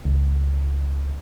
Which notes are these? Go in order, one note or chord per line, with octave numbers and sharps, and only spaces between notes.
C#2